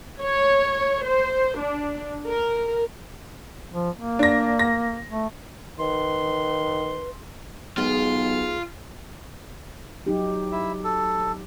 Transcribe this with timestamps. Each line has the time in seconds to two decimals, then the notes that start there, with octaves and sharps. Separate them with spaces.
0.21 C#5
1.03 C5
1.57 D4
2.26 A#4
3.73 F3
3.97 A#3
4.19 D4 A#6
4.59 A#6
5.11 A3
5.79 D#3 B4 C6
7.77 B1 G#3 B3 F4 G#4
10.07 F#3 D#4 G4
10.52 E4
10.84 A4